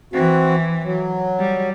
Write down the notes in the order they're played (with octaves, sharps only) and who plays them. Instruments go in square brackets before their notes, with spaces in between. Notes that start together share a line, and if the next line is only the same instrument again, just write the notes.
[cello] E3 [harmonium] C4 F#4
[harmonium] F#3
[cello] G3